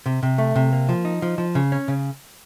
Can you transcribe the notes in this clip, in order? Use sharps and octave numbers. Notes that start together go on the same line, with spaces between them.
C3
C3
A3
C3
A#3
F3
D#4
F3
F3
C#3
C#4
C#3